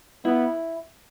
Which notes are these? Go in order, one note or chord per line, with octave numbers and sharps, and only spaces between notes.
B3 E4